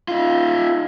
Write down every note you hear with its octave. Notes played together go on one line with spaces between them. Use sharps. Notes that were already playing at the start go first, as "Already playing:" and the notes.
D#4 F4